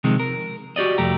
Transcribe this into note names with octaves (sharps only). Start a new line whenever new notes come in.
C3 D#3 F3 G#3
A#4
F#4 G4 D5 D#5
C2 F2 A3 G4 A#5